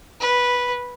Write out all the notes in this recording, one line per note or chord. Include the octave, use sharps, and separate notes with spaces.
B4